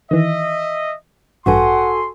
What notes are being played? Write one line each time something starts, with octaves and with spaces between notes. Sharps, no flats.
D#3 E3 D#5 E5
A1 G2 F#4 A4 B4 F#5 G#5 C6